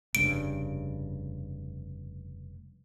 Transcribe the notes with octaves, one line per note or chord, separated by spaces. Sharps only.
F1 G2 C#3 D7